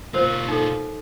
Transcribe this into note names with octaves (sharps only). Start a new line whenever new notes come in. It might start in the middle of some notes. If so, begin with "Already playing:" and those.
B2 F4 A#4 C5
D#4 A4